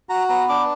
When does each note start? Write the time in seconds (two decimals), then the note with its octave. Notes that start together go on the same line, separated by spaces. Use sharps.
0.09 F#4 A#5
0.29 B3 A#5
0.49 D4 D6